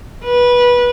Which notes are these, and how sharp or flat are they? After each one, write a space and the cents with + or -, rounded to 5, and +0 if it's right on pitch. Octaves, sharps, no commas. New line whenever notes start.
B4 -20